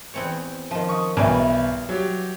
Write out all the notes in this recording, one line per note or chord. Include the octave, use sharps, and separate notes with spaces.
E2 C4 C#5
D#3 F3
C#6 D#6
B1 E3 G3 G#5
F#3 G4